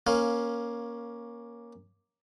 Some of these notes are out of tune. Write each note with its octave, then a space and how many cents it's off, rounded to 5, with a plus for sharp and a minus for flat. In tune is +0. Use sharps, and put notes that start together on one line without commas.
A#3 +15 C#4 +0 F5 +5